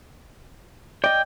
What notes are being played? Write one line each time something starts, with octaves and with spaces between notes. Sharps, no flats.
D5 D#5 G5